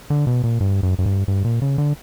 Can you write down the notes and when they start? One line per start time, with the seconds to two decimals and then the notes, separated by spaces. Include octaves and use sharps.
0.10 D3
0.27 B2
0.44 A#2
0.61 G2
0.83 F#2
0.99 F#2
1.06 G2
1.28 G2
1.45 A#2
1.62 C#3
1.78 D3